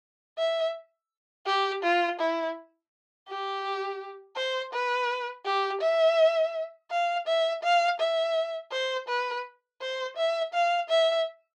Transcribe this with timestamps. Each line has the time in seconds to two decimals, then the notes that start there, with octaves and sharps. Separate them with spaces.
0.38 E5
1.46 G4
1.83 F4
2.19 E4
3.28 G4
4.36 C5
4.73 B4
5.45 G4
5.81 E5
6.91 F5
7.27 E5
7.63 F5
8.00 E5
8.72 C5
9.08 B4
9.81 C5
10.17 E5
10.54 F5
10.90 E5